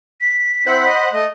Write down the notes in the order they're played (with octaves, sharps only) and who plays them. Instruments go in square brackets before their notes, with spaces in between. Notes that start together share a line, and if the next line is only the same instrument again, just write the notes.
[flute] B6
[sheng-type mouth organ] C4 E4 [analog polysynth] C5 F#5 B5
[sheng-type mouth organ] D#5
A3 D#5